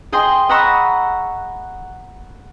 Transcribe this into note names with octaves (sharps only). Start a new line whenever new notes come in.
G#4 D#5 G5 C6
D#5 F#5 A#5 B5 C#6 E6